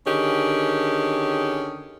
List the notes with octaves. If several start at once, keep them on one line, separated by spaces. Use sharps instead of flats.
D3 D#3 C#4 G4 G#4